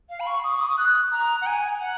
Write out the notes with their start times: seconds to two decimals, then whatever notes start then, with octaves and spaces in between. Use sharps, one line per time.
0.10 F5
0.20 B5
0.27 C#6
0.44 D#6
0.52 C#6
0.61 D#6
0.78 F#6
1.12 A#5
1.41 F#5
1.46 G#5
1.80 F#5